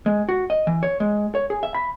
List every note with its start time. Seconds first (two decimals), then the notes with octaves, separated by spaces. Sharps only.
0.06 G#3
0.29 F#4
0.50 D#5
0.67 E3
0.83 C#5
1.00 G#3
1.35 C#5
1.50 G#4
1.63 E5
1.74 B5